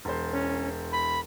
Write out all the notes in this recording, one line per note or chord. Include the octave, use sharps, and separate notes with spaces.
E1 C5
C#4
B5